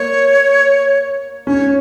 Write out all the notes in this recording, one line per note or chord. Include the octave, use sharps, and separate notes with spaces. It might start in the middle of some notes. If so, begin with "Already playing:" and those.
Already playing: A#3 C#5
C#4 C#5